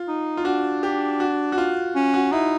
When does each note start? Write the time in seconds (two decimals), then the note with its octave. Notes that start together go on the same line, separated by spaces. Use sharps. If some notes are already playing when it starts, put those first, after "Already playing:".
Already playing: F4
0.08 D#4
0.37 F4
0.45 D4 F#4
0.83 G4
1.20 F#4
1.52 F#4
1.58 F4
1.95 C#4
2.14 F#4
2.32 D#4 E4